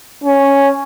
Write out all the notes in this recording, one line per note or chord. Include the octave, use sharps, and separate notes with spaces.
C#4